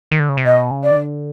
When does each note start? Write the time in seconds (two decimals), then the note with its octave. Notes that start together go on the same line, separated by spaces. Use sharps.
0.11 D#3
0.20 D3
0.29 C#3
0.37 C3
0.45 B2 D#5
0.71 C#3
0.83 D5
0.91 D#3
0.96 D3